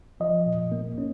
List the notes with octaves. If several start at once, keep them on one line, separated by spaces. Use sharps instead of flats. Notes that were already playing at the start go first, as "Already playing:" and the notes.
F3 D#5
A#2
A#3
C#4